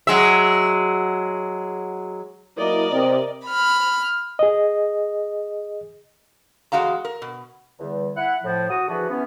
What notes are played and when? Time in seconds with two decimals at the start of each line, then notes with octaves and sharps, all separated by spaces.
0.07 F#3 G#3 E5
2.57 F#3 A#3 E4 A#4 D5 D#5
2.91 C3
3.45 B5 F6
4.39 G#4 D#5
6.72 E2 G#3 F#4 F5 A#5
7.05 A#4
7.22 B2
7.80 E2 D3 G3
8.17 E4 F#5
8.44 A2 F3
8.70 F#4 D#6
8.88 D3 E3 F3 F#4 G#4 B4
9.10 E3 B3 C#4